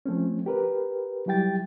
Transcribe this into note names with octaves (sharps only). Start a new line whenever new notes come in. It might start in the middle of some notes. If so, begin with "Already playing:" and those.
F3 A3 C4 C#4
G4 A#4 B4
F#3 G3 E4 G4 G5 A6